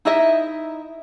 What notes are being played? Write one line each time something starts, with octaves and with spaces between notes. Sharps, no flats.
D#4 E4 D#5 E5